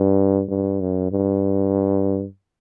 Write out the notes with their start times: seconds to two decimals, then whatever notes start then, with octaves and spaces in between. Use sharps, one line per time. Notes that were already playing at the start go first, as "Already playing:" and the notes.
Already playing: G2
0.49 G2
0.80 F#2
1.12 G2